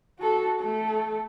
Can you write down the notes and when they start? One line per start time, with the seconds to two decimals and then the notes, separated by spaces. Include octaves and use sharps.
0.20 F#4 A4
0.60 A3 A4